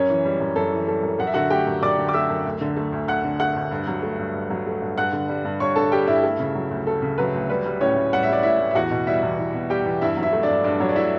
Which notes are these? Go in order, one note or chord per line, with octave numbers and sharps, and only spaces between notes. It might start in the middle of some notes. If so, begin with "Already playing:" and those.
Already playing: F#2 C#4 C#5
E3
G3
F#2
F#2 A4
E3
G3 A4
F#2
F#2 F#5
E5
D3 F#4 F#5
A3 G4 G5
F#2
F#2 D5 D6
D3
D6
A3 E5 E6
F#2
D2
D3
A3
D2
D2 F#5 F#6
D3
A3 F#5 F#6
D2
G2
F#3
A3
G2
G2
F#3
A3
G2
G2 F#5 F#6
D3
G3
G2
G2 C#5 C#6
D3 A4 A5
G3 G4 G5
G2 E4 E5
A3
C#3
F#3
D2
A3 A4
C#3
F#3 B4
D2
G3 B4
G3
A2 C#4 C#5
A2
G3 F#5
E5
G3 D5
A2 E4 E5
A2
E5
E2 F#4 F#5
B2
G3 E4 E5
E2
E2
B2
G3 G4 G5
E2
G2 E4 E5
F#3
E4 E5
A3
D4 D5
G2
G2 D4 D5
F#3 C#5
D5
A3 E4 E5